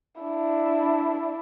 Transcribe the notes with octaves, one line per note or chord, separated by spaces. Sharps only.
D4 E4